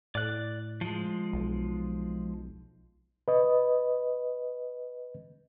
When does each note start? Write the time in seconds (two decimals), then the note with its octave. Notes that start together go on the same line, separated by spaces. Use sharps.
0.15 A2 D5 F#6
0.81 F3 G#3
1.33 B1
3.28 B4 D#5